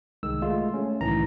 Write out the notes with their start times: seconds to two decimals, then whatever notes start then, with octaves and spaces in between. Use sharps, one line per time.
0.23 C2 D#3 G#3 E6
0.42 G#3 A3 F4
0.74 A3 C#4
1.01 C2 A2 D#3 E3 A#5